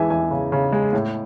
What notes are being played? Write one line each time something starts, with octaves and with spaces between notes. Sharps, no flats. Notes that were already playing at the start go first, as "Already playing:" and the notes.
Already playing: E2 E3 G#3 E5 G#5
E2 E5 G#5
C#3
C#3
G#3
A2